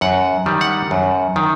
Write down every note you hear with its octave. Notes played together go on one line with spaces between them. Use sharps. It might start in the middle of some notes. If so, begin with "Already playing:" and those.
F#2 F#5
D#3 G3
F#5
F#2
D#3